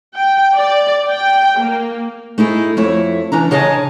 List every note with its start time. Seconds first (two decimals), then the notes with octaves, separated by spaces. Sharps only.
0.15 G5
0.56 D5
1.08 G5
1.59 A#3
2.38 A3 D#4 E4 G#4
2.77 F2 A3 E4 C#5
3.32 E3 C#4 D4 A#5
3.51 C#3 G#4 C#5 D#5 F#5 A5